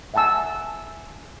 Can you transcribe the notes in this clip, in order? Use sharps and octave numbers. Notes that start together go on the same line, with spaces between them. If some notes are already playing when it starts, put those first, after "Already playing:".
E5 F#5 G#5 A5 E6